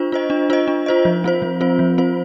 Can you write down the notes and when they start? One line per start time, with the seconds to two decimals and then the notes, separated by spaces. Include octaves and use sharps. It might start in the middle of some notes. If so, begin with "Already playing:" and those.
Already playing: D4 F4 C5
0.12 F4 C5 D#5
0.30 D4
0.50 F4 C5 D#5
0.68 D4
0.86 F4 C5 D#5
1.05 F3
1.24 C4 F4 C5
1.42 F3
1.61 C4 F4 C5
1.79 F3
1.98 C4 F4 C5